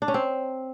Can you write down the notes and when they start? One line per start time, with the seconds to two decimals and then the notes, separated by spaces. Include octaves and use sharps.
0.02 D4
0.08 C#4
0.14 C4